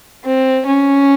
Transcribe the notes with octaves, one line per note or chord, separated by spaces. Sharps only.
C4
C#4